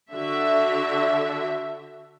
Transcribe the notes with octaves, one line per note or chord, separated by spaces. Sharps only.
D3 F#4 E5